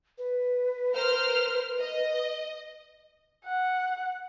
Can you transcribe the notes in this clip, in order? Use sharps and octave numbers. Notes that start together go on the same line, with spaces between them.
B4
A#4 C5 F6
D#5
F#5